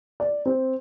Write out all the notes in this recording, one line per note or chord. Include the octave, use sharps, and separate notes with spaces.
D5
C4